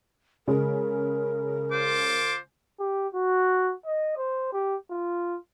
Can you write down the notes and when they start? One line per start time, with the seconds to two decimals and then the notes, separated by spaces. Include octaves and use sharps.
0.48 C#3 G#3 A#4
1.71 F4 C5 D6
2.79 G4
3.15 F#4
3.86 D#5
4.18 C5
4.53 G4
4.91 F4